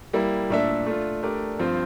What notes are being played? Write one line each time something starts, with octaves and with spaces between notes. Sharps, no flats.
G3 A#3 E4
A#2 A3 D4 A4 E5
A3 D4 F4
A3 D4 G4 A#4 D5
G2 F3 C4 F4 C5